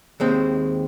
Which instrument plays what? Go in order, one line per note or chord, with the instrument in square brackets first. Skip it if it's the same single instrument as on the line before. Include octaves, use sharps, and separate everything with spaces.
[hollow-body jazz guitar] D#2 G#3 C4